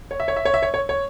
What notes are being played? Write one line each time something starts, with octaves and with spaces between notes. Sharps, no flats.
C#5
E5
C#5
E5
C#5
E5
C#5
C#5
C#5